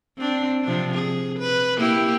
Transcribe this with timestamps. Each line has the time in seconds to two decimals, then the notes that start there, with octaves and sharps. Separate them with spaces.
0.18 C4 D4
0.63 C3 F3 D4
0.94 G#4
1.39 B4
1.78 A#3 E4 G4